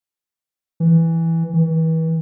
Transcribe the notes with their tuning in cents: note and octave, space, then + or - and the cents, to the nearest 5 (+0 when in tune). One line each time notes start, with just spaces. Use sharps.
E3 +0
E3 -35